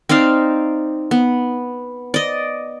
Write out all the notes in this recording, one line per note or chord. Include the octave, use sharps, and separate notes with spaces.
C4 D#4 D5 F5
B3
D5 D#5